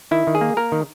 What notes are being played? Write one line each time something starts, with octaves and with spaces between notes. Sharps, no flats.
D#3 E4
D#3
G#4
A#3
A#3 A#4
D#3